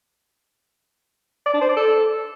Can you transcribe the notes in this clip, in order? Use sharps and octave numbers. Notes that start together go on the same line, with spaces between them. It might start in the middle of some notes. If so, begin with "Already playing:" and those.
D5
D4
C5
D5
A4